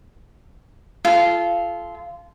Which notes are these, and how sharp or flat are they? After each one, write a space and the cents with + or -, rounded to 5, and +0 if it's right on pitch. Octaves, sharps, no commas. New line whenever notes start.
F4 -20 A4 -30